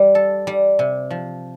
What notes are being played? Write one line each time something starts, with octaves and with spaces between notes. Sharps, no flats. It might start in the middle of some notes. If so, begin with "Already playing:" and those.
Already playing: G3
A4
G3
C3
F3